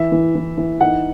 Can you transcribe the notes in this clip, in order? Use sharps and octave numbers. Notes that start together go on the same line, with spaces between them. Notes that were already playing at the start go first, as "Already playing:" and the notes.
Already playing: E3 E5
E3
E3
E3
D#4 F#5